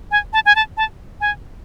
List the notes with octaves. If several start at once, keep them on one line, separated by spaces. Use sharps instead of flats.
G#5
A5
G#5
A5
A5
G#5